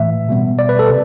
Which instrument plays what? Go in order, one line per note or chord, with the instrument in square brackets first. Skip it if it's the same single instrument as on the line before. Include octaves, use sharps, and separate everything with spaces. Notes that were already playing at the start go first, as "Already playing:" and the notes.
Already playing: [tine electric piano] A2 E3 A3 E5
B2 G3 B3
D5
B4
A4
C3